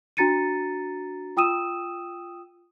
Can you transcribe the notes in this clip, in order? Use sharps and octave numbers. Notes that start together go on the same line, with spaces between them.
D4 F#4 A#5 A6 C#7 D#7
F4 G5 D#6 E6 D#7 E7